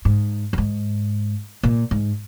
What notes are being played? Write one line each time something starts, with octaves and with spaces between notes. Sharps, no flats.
G#2
F2
G#2
A#2
G#2